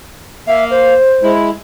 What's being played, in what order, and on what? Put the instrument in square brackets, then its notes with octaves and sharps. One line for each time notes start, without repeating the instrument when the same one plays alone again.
[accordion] A#3 F5 [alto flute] E5
[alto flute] C5
[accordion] G#3 E4